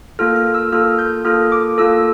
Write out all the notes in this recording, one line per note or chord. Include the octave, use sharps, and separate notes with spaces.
A#3 F4 A4 F6
F6
E6
A#3 F4 A4 F6
G6
A#3 F4 A4 F6
D6
A#3 F4 A4 E6